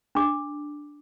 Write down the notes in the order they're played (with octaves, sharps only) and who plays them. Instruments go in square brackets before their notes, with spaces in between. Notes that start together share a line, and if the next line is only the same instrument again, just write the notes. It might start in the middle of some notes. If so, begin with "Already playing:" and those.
[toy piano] D4 D6